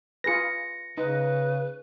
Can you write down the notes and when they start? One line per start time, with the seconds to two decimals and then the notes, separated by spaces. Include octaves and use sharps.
0.24 F4 G#4 B4 A#6 C#7
0.98 C#3 D#4 B4